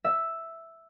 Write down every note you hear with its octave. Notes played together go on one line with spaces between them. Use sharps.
E5